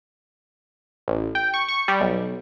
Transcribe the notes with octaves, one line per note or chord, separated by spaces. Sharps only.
A1
G5
C#6
C#6
G3
B1